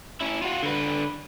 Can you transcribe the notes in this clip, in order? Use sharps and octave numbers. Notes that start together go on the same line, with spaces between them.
C#4 E4
F4 F#4
D3 B4